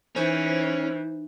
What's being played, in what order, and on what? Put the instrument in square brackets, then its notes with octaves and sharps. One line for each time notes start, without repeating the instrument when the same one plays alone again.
[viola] E3 [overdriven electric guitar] C#4 [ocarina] D#4 [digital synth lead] C5